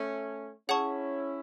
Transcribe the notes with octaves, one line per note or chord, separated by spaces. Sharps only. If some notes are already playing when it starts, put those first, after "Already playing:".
Already playing: A3 C#4
C#4 E4 G#4 C#5 F#5 A5 C#6